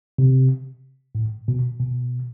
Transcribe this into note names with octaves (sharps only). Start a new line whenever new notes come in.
C3
A2
B2
B2